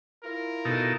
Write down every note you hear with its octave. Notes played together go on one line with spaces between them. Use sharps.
E4 F4 A#4
B2 D#4 A4